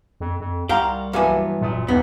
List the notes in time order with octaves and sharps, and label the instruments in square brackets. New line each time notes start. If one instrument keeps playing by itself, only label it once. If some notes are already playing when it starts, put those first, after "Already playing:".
[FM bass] F2
F2
[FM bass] C2 [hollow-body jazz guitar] G4 [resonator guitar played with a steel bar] F5 A#5 [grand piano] F#5 C6
[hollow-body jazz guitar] G2 E3 [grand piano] F#3 E5 [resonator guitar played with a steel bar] A#3 B3 G#5
[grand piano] E1 F#2 D#6 [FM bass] A#2
[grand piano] D#1 A2 D#4 [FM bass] D#2 [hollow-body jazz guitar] B3